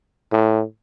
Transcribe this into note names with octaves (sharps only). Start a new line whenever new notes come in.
A2